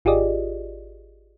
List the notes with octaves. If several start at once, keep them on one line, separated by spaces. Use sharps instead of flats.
G#1 F4 G4 G#4 D5 D#5